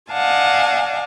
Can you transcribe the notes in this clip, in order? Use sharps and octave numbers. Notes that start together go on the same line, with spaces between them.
D5 D#5 F5 F#5 G#5 A5